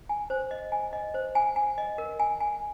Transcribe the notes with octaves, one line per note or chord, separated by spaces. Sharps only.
G#5
C5
D#5
G#5
D#5
C5
G#5
G#5
D#5
A#4
G#5
G#5